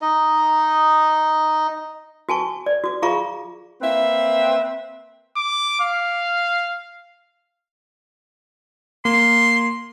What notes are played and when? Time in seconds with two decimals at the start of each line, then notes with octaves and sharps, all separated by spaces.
0.02 D#4 D#5
2.29 F#4 G#5 A5 C#6
2.66 D5
2.84 F#4 D6
3.02 F4 G#4 F5 A#5 C#6 D6
3.80 A#3 C4 B4 E5
5.37 D6
5.81 F5
9.05 A#3 C6